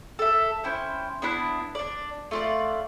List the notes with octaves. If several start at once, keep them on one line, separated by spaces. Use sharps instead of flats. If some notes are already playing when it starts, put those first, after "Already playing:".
A4 E5
C#4 E4 C5 G5
B3 D4 E4 F#6
D4 D5
A3 F4 D5